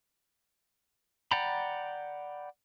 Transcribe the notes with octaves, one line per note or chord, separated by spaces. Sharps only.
D5 F#5 G5 A#5 B5